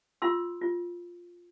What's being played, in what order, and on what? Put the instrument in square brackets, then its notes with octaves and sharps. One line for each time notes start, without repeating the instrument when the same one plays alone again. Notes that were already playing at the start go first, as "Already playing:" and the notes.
[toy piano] F4 C6 E6
F4